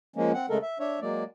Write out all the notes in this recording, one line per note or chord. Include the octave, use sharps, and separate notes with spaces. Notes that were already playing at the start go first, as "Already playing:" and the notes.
F3 G#3 A#3 C#4
C4 F#5
C#3 G#3 A3 A4 A#4
E5
D4 C#5 E5
F#3 G#3 A#3 D5